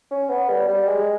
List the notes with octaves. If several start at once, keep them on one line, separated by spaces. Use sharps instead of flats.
C#4
B3
G3
G3
G#3